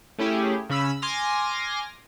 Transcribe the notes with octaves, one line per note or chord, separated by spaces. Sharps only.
A3 C#4 E4 G4 G#4
C#3 C#4 B5 E6
G#5 C6 D6 F6 A#6